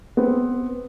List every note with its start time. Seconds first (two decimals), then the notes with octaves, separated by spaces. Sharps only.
0.17 B3 C4